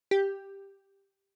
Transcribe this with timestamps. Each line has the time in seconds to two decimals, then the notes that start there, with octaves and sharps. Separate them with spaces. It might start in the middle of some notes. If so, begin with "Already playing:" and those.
0.11 G4